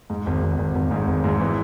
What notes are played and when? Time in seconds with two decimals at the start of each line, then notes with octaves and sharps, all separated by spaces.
0.10 G#2
0.26 G#1
0.43 G#1
0.58 G#1
0.75 G#1
0.91 G#2
1.07 G#1
1.24 G#2
1.40 E3